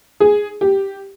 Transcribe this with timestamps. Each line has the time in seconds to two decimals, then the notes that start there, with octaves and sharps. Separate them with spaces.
0.20 G#4
0.61 G4